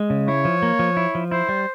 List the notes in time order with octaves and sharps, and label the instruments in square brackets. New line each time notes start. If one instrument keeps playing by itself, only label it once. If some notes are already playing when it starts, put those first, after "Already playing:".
Already playing: [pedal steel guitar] G#3
C#3
[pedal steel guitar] E4 [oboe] C#5
[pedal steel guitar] F3
A#3
F3
E4
F3
[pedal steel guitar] E4 [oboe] C5
[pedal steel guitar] G3